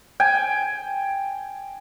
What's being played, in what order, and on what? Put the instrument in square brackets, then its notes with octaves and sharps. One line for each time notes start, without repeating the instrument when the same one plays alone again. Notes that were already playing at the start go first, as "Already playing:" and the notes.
[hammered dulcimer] G5 G#5